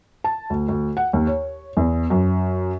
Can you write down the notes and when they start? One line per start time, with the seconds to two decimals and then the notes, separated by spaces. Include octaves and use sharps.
0.24 A5
0.50 D2
0.69 D2
0.97 F#5
1.13 D#2
1.27 C#5
1.77 E2
2.10 F#2